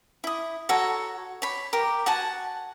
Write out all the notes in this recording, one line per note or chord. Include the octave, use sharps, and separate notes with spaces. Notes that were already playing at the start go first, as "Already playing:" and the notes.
E4 D#6
F#4 A4 C#5 A#5
C#5 B5
G4 A#4
F#4 F#5 G#5 A5